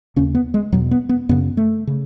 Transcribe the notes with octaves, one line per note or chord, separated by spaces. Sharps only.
D#2 C#3 C#4
B3
G#3
E2 B2 F#3
B3
B3
F#2 C#3 B3
A3
C#3